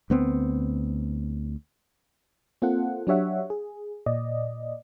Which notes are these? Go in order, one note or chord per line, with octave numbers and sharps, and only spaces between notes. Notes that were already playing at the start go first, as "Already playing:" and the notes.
D2 B3 C4
A#3 C4 F4 A4 F#5
F#3 D4 G4 C#5 E5 F#5
G#4
A#2 D5 D#5